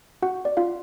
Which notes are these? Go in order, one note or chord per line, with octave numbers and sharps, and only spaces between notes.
F#4 F#5
D5
F4 F5